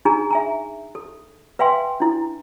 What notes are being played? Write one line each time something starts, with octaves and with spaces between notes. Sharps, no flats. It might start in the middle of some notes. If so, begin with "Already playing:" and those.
D4 D#4 G#4 G#5 A#5
E5 G#5 A#5
A4
B4 E5 F5 G5 G#5 C6
D4 E4